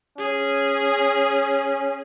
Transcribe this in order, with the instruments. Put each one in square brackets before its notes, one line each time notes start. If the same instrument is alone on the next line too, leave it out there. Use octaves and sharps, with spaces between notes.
[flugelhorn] C#4 [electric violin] G#4